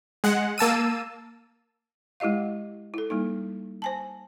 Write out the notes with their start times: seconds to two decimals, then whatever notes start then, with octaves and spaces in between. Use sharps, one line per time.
0.24 G#3 F#5
0.58 A#3 A5 E6 D#7
2.20 G#3 E4 G4 D#5 F5
2.94 E4 A4
3.10 G3 A#3 D#4
3.82 C5 G#5 A5